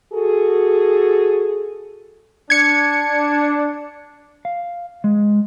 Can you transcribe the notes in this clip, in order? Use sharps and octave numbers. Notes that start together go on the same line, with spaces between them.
F#4 G#4 A4
D4 G#6 C#7
F5
G#3